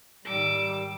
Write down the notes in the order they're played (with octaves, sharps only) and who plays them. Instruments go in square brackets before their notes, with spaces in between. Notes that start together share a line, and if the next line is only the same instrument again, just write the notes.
[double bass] G#2 D#3 [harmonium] G3 [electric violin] D6 E6